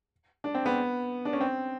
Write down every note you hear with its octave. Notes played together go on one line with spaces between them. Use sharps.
D4
C4
B3
D4
C#4
C4